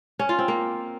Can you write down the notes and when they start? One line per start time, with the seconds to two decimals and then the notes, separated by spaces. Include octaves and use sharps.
0.19 C#4
0.29 F4
0.39 C4
0.48 A#3